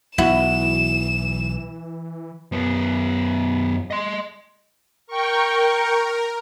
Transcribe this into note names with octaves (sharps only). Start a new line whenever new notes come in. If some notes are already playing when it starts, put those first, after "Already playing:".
B1 E3 E4 F#4 E7
F#2 B3
D#5 C6
A#4 G5 C#6